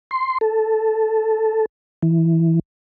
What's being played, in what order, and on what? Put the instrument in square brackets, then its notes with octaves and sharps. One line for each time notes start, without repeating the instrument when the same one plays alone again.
[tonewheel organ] C6
A4
E3